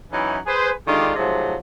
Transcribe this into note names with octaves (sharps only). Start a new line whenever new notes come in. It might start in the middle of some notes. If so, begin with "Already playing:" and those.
E3 F#3 C#4 D#4 E4
G#4 B4 C5
D3 D#3 G#3 D4 F4 G4
G#2 C3 F3 F#3 G#3 A3